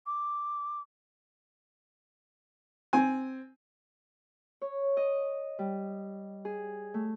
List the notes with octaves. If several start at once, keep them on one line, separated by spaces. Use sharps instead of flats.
D6
C4 G#5
C#5
D#5
G3
G#4
A3